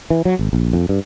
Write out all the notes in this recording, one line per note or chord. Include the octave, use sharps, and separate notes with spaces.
E3
F#3
G#1
A#1
F2
G2